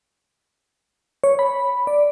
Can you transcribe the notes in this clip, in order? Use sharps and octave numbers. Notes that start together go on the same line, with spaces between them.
C#5
B5
D5